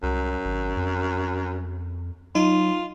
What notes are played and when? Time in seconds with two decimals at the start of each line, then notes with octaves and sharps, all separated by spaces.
0.03 C2 F#2
0.45 G#1
0.76 F2
2.35 F#3 D#4 F4